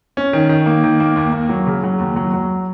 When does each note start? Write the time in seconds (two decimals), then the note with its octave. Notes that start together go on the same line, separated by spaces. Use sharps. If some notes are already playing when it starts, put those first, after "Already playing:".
0.17 C#4
0.33 D#3
0.49 D#3
0.66 A#3
0.84 D#3
1.00 A#3
1.16 D#2
1.32 A#3
1.49 F#3
1.67 C#3
1.83 F#3
1.99 D#2
2.16 F#3
2.33 F#3